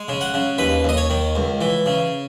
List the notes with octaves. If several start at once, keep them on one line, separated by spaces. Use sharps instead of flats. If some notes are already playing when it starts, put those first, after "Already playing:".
Already playing: G#3
C#3
F#5
C#3
D#2 B4
D#2 D#5
C#5
D#3
C#2
E3
C#3